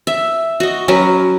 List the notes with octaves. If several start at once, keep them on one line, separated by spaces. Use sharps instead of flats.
E5
F#4 D#5
F#3 C#4 A#4 B4